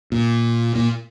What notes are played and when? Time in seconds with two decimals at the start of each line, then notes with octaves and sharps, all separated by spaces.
0.12 A#2
0.75 A#2